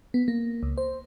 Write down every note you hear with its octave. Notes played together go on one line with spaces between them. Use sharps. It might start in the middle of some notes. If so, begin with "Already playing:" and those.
B3
A#3
C#2
C5